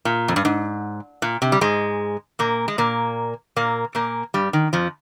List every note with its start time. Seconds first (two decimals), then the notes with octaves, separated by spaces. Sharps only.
0.05 A#2
0.28 F2
0.36 G2
0.45 G#2
1.22 A#2
1.42 C3
1.52 G3
1.61 G#2 G#3
2.39 A#2 A#3
2.68 G#3
2.78 A#2 A#3
3.56 A#2 A#3
3.95 A#2 A#3
4.34 G2 G3
4.53 D#3
4.73 F2 F3